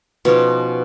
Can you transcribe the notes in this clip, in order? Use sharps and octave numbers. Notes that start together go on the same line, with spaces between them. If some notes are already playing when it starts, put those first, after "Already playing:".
B2 F3 C#4 D#4